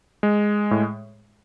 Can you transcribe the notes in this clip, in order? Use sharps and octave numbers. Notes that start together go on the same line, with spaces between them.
G#3
A2